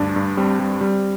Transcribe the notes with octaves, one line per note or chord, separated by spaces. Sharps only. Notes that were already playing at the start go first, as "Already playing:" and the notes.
Already playing: D2 G2 D4
G2
G3 C4
G3
G3